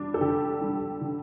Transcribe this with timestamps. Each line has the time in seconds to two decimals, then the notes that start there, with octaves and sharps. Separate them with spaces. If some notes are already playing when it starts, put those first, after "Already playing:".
Already playing: G3 D4
0.14 A4
0.21 D3 G4
0.61 G3 D4
1.01 D3